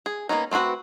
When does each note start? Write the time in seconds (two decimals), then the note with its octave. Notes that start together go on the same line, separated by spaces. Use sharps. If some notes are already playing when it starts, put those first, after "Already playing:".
0.06 G#4
0.29 A#3 B3 C#4 D#4
0.51 A3 C4 D4 F#4 B4